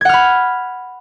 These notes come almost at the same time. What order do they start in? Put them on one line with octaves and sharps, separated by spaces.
G#6 F#5 F6 B5